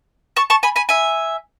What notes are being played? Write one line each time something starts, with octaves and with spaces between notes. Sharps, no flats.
A5 C#6
A5 C#6
G#5 B5
G#5 B5
E5 G#5